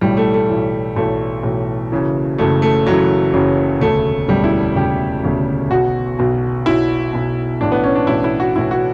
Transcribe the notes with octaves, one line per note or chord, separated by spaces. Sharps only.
B1 A2 E3 G3
A3
A3
B1 A2 E3
B1 A2 E3 A3
B1 A2 E3
F#1 F#2 C#3 E3
F#1 F#2 C#3 E3 A3
A3
F#1 F#2 C#3 E3 F#3
F#1 F#2 C#3 E3
E1 D2 C#3 A3
E1 D2 C#3 G3
E4
E1 D2 C#3 G4
E1 D2 C#3
B1 B2 F#4
B1 B2
B1 B2 E4
B1 B2
B1 A2 E3 D4
B3
C#4
D4
B1 A2 E3 E4
E4
F#4
B1 A2 E3 E4
F#4